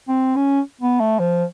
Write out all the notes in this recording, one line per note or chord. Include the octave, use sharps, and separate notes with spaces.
C4
C#4
B3
A3
F3